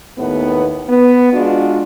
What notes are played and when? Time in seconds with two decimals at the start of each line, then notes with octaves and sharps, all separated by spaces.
0.18 D#2 A2 B3
0.89 B3
1.33 G#3 D4 F4 F#4